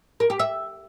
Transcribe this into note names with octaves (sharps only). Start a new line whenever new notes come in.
A#4
G4
E5